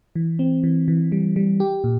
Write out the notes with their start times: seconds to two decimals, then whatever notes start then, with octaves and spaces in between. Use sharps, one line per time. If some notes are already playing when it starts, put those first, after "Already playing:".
0.16 E3
0.39 C4
0.63 E3
0.88 E3
1.12 G3
1.36 G3
1.60 G4
1.84 A#2